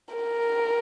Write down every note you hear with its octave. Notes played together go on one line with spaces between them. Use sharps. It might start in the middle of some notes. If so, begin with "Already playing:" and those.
A#4